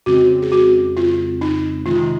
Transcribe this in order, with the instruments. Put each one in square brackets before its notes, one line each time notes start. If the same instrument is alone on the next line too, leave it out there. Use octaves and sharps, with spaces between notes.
[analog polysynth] F2 C#3 G#3 C4 [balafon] F#4
[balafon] G#4
F#4
F4
D#4
[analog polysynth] C3 D#3 G#3 [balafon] F4